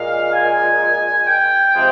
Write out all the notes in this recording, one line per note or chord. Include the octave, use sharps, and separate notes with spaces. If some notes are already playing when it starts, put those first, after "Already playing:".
Already playing: A#2 G#3 F5
G#5
G5
C3 F3 G#3